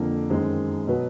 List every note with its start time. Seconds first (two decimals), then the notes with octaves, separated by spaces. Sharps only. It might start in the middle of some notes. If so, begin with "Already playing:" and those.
Already playing: F2 D3 F3 A#3
0.30 F#2 D#3 G#3 C4
0.87 B2 F#3 B3